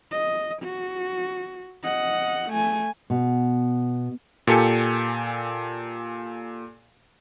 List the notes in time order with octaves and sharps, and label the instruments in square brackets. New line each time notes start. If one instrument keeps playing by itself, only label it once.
[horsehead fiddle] D#5
F#4
D#5 F#5
A3 G#5
[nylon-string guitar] B2
[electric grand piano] A#2 G4 A4 G#5 C#7